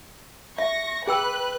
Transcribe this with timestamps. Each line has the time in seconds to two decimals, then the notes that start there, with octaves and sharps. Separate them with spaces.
0.58 E5 C#6 A#6
1.07 G#4 B4 G5 E6 F#6